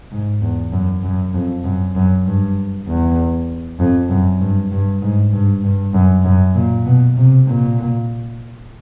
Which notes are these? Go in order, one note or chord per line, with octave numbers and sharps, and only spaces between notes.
G#2
E2
F#2
F#2
F2
F#2
F#2
G2
E2
F2
F#2
G2
G2
G#2
G2
G2
F#2
F#2
A#2
B2
C3
A#2